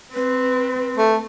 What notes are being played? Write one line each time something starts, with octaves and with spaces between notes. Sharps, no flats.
C4 B4
A3